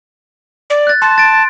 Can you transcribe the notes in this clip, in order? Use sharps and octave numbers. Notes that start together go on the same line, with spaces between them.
D5
F#6 A6
A5 C6
A6 D7